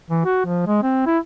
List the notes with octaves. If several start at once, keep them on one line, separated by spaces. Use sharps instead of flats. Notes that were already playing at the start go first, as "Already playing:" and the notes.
E3
F#4
F3
G#3
C4
E4